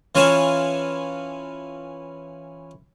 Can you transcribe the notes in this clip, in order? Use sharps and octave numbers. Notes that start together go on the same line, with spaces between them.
E3 C#4 F4 C#5 G#5 A5